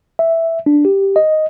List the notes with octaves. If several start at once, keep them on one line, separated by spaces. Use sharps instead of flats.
E5
D4
G4
D#5